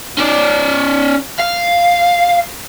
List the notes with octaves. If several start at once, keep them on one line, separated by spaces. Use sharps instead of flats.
C#4 D5
F5